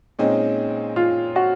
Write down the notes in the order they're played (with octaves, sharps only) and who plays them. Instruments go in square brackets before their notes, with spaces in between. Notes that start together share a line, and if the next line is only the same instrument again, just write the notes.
[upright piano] A#2 G#3 C4 D#4 [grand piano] C#4
[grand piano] F4
F#4